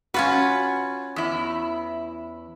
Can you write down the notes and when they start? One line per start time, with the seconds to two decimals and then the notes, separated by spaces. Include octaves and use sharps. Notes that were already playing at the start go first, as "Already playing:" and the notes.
0.14 C#4 F4 F#4 B4
1.16 E2 E4